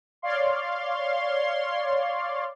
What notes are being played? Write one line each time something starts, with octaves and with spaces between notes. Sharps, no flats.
C#5 D5 F5 C6